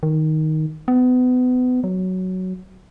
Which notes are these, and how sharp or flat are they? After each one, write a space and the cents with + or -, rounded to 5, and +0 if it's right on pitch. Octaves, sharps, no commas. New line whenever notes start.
D#3 +5
B3 +30
F#3 +5